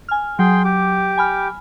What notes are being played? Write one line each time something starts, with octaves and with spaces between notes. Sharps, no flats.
G#5 F6
F#3 G#4 G5 C6
G4 D6
G#5 B5 F6